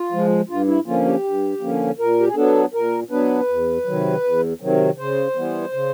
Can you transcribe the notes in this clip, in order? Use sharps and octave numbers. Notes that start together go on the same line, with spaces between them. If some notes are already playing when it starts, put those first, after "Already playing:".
Already playing: F4
F3 G#3
G2 F4
E4
D3 F3 A#3 C#4 F4
G4
G2
D3 F3 A#3 C#4
A#2 A#4
G4
G#4
F#3 B3 D4 A4
A#2 A#4
F#3 B3 D4 B4
E2
C3 D#3 F#3
E2
C3 D#3 F#3
C#3 C5
E3 G3 B3
C#3